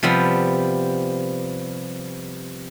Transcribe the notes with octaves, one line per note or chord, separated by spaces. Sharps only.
C3 F3 G3 B3